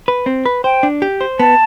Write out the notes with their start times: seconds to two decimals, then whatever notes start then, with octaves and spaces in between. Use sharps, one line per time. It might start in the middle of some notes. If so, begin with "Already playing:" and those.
0.08 B4
0.26 C4
0.46 B4
0.64 C5 G5
0.83 D4
1.02 G4
1.21 C5
1.40 B3 A5